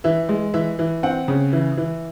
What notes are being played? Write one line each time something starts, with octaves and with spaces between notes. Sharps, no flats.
E3 E5
G#3
E3 E5
E3
C4 F#5
C#3
E3
E3